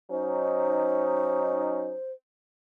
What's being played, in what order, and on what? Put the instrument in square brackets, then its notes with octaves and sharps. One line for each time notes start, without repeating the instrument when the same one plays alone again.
[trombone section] F#3 C#4 D#4 [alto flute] C5